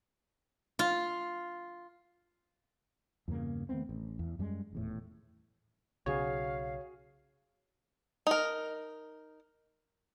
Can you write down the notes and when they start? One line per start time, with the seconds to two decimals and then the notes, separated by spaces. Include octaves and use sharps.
0.79 F4
3.28 E2 G2 C#3 A#3
3.69 D#3 A3 B3 C4
3.89 A1
4.19 E2
4.39 F#2 G3 G#3
4.73 D#1 E2 A2
6.06 B1 C#3 F#4 G#4 C#5 F5
8.27 D#4 A#4